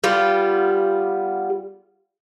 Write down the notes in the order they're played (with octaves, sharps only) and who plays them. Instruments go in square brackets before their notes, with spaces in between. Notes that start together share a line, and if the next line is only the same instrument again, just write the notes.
[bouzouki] G3 B3 F4 G4